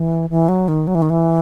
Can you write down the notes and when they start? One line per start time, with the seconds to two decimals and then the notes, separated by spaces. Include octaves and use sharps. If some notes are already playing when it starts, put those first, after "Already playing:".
Already playing: E3
0.30 E3
0.49 F#3
0.68 D#3
0.87 F#3
0.95 E3
1.02 D#3
1.10 E3